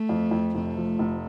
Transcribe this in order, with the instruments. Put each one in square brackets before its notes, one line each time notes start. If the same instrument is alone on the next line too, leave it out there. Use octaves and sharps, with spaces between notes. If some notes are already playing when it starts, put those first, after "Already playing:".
Already playing: [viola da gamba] A3
[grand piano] F2
F2
[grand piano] F1 [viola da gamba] A3
[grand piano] F3
F1